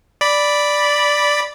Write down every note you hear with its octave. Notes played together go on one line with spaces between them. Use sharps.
D5 B5